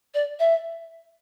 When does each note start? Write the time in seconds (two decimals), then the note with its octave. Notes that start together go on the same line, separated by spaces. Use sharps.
0.14 D5
0.39 E5